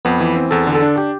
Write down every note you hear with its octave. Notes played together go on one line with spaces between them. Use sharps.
F2 B3
E3
C4
E2 A4
D3
A4
D4
G4